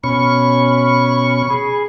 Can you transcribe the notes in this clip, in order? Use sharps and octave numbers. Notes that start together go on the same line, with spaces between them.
B2 C#4 B5 C#6
G#4